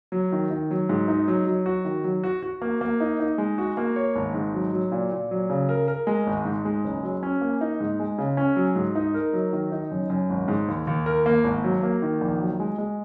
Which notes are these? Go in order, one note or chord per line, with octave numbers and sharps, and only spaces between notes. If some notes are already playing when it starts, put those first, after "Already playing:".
F#3
D#3
D#3
F#3
G#2
D#4
F#3
F#3
F#4
D#3
F#3
F#4
F#4
A#3
A#3
D#4
D#4
G#3
F#4
A#3
C#5
G#1
G#2
F#3
F#3
A#2
A#2
F#3
C#3
A#4
A#4
G#3
G#1
G#2
G#3
F#1
F#3
C#4
A#3
D#4
G#2
G#3
C#3
C#4
F#3
G#2
D#4
A#4
F#3
D#3
D#4
F#2
F#2
G#1
G#2
D#2
D#2
A#4
A#3
G#1
F#3
A#3
D#3
A#1
F#3
G#3
G#3